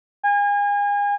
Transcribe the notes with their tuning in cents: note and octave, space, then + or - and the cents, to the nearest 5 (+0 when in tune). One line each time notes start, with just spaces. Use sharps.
G#5 -35